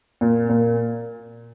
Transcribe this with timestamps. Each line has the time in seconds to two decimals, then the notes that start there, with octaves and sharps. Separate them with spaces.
0.21 A#2
0.50 A#2